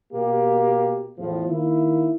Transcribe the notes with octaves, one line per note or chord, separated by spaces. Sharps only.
B2 A#3 G4
E2 A2 F3
D#3 A#3 E4